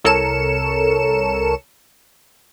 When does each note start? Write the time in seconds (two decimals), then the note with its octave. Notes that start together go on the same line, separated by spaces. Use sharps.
0.04 C2 A4 A#4 C#5 C#7 E7